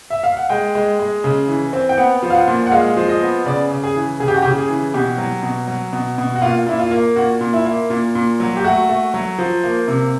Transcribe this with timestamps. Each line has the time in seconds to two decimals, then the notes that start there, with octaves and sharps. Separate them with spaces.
0.10 E5
0.23 F5
0.37 F#5
0.50 G#3 G5
0.75 G#3
0.99 G#3
1.24 C#3
1.48 E3
1.73 C4
1.89 G5
1.97 B3 F#5
2.23 F3
2.30 F5
2.35 F#5
2.47 A#2
2.67 F#5
2.72 G#3 F5
2.97 F3
3.09 D#5
3.21 B3
3.46 C#3 D5
3.71 C#3
3.83 G#4
3.96 E3
4.20 C#3 G#4
4.28 G4
4.34 F#4
4.42 G4
4.45 C#3
4.57 G#4
4.70 E3
4.94 B2 G4
5.18 F#3
5.43 B2
5.68 F#3
5.93 B2
6.18 B2
6.36 F#4
6.42 A#2 F4
6.66 A#2 E4
6.79 F4
6.91 A#3
7.16 A#2 F#4
7.41 A#2
7.53 E4
7.65 A#3
7.90 A#2
8.15 A#2
8.40 F#3
8.57 G4
8.64 A3 F#4
8.89 A3
9.14 F#3
9.38 F3
9.64 A#3
9.88 C3